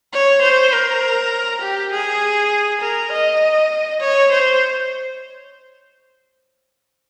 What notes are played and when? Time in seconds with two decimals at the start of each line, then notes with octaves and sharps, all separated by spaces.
0.13 C#5
0.42 C5
0.72 A#4
1.61 G4
1.92 G#4
2.81 A#4
3.12 D#5
4.01 C#5
4.32 C5